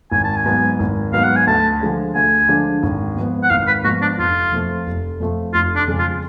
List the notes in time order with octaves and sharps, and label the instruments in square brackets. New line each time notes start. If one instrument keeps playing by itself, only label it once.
[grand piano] G#1 [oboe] G#5
[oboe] A5
G#5
[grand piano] G#2 F#3 B3
G#1
[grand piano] G#2 F#3 B3 [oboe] F5
[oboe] F#5
G#5
[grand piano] D2 [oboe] A5
[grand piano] D3 F3 G#3 D4
[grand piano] D2 [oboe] G#5
[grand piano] D3 F3 G#3 D4
G#1
G#2 F3 B3
[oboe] F#5
[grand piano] G#1 [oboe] F5
[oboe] B4
[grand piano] G#2 F3 B3 [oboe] F#4
[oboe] D4
[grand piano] F1 [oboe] F4
[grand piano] F2 F3 A3
F1
F2 F3 A3
[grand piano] F1 [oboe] F4
[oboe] D4
[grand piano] F2 C#3 G#3
[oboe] F4